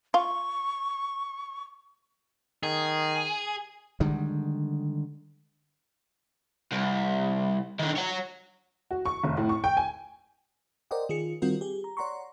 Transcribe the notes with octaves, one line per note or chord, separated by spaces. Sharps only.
F4 C#6
D#3 G#4
D3 D#3 G3 G#3
C2
D3 D#3
C#5 F#5
F#4
C#6
F1
A2
C#6
G5
G#5
A#4 C5 D5 D#5 F#5 G5
D#3 F4 G#4 C#7
D#3 G3 C4 F4 F#4 A#4
G4 G#4
A#5
C#5 D5 F#5 A#5 C6 C#6